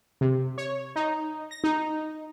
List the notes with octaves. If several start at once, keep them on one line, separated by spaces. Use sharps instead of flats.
C3
C#5
D#4
A#6
D#4